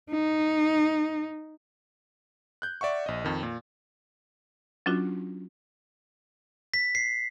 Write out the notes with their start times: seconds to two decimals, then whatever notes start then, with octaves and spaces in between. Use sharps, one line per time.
0.10 D#4
2.62 F#6 G6
2.81 D5 E5 F#5 C#6
3.06 A#1 D#5
3.25 F2 D#3
3.43 A#2
4.86 F#3 C#4 D4 F4 F#4
6.74 B6
6.95 C7